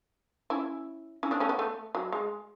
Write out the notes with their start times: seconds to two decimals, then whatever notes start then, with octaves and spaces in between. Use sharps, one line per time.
0.50 C#4 E4
1.23 C#4 E4
1.31 B3 D4
1.40 A3 C#4
1.49 B3
1.59 A3
1.95 F#3
2.12 G#3